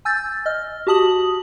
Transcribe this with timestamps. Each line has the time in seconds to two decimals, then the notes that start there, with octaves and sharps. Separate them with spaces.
0.05 G#5 E6 G6 A6
0.46 D#5 F6
0.87 F#4 G4 A5 D#6 F#7